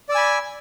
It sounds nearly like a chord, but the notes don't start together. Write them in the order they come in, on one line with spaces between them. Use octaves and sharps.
D5 E6 G#5 B5